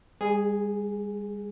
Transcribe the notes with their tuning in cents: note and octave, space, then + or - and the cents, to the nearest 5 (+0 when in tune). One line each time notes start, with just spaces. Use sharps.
G3 +45 G#4 +0